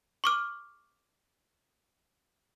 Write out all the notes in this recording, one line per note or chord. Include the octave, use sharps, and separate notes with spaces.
C#6 D6 F6